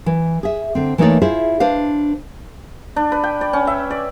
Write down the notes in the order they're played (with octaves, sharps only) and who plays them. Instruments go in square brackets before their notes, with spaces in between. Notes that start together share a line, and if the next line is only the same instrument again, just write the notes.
[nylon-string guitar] E3
G#4 E5
D3 C4
E3 A3 A#3 D#4 C#5 D5
E4 F4 G#4 C5 E5
D4 B4 C5 F5
[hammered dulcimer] D4
B4
G5
D5
C#4
E5
D5